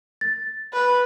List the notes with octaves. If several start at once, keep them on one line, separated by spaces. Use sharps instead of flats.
A6
B4